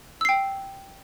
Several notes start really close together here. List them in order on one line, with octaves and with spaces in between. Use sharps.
E6 C7 G5